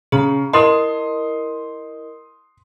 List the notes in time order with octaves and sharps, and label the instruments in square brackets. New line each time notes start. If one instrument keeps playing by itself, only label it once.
[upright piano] C#3 [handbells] G#4 A#5
[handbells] E4 A#4 D#5 [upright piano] C6 D#6